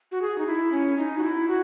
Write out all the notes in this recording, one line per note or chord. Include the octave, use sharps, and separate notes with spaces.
F#4
G#4
D#4
E4
C#4
D#4
F#4
E4
F#4